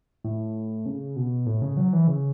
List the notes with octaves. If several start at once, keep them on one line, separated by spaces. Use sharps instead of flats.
A2
C#3
B2
A2
C#3
F#3
E3
C#3